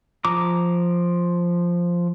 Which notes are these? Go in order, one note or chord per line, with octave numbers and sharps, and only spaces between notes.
F3 A#5 D6 D#6